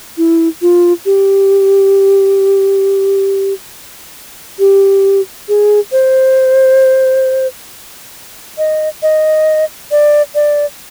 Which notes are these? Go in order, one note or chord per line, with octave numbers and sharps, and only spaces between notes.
E4
F4
G4
G4
G#4
C5
D#5
D#5
D5
D5